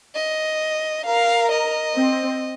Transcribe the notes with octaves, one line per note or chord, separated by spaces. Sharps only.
D#5
A#4 F5
D#5
C4